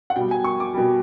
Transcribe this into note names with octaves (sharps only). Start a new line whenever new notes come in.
F#5
B2 G3 G5
G#5
C#6
D6
B2 G3